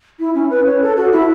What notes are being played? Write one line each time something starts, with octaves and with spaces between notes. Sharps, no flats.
E4
C#4
B4
C#5
A4
F#4
E4